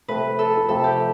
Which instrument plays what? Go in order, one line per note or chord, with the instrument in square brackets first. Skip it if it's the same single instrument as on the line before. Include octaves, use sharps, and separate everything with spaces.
[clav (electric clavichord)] C3 F3 A3 [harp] B4
[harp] A4
[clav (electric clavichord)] C3 F3 A3 [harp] A4
[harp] G4